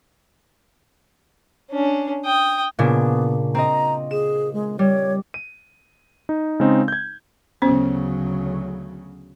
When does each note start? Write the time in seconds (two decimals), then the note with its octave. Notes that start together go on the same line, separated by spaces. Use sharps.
1.70 C#4 D4
2.25 G5 D#6
2.79 A#2 C#3 B3 D4
3.55 C4 D#5 A#5
4.11 G#4 E7
4.53 G#3
4.79 G3 C#5
5.34 D#7
6.29 D#4
6.60 C#3 G#3 C4 D#4
6.88 G6 G#6
7.62 D2 C#3 F#3 B3 C#4 C5